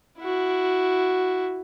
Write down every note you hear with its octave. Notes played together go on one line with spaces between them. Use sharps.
E4 F#4